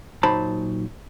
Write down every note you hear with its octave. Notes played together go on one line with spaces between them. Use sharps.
A#2 F#3 D#4 C5 A5 B5